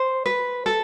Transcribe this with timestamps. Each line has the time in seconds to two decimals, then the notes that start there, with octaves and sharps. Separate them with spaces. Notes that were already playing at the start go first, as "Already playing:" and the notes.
Already playing: C5
0.26 B4
0.66 A4